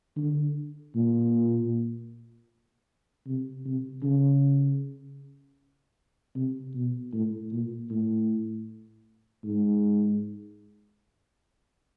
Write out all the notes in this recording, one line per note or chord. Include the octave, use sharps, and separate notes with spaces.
D3
A#2
C3
C3
C#3
C3
B2
A2
A#2
A2
G#2